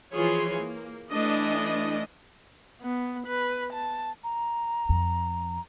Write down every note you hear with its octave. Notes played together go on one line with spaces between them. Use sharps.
E3 F3 F4 G#4 C#5 C6
A#3
E3 A3 D4 D#5
B3
B4
A5
A#5
F2